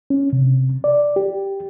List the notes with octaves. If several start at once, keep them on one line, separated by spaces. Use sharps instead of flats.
C#4
C3
D5
G4